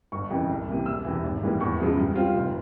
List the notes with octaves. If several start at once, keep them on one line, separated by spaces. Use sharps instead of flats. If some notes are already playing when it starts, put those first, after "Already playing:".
G1 C#6
F2 C#3 E3
C2
C3 E3 A#3
E1 E6
E2 C3 E3
G#1
G#2 E3 G3 A#3
E2 C#6
C#3 F3 G#3 E4
G2
G3 C4 F4
F1